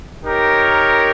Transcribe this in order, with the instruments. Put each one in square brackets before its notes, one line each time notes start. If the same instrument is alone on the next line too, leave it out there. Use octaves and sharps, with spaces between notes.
[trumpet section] D#4 G4 A#4 C#5